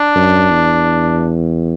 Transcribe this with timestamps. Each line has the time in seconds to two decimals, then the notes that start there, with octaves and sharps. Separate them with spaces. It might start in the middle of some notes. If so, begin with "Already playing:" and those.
Already playing: D4
0.15 F#2
0.51 E2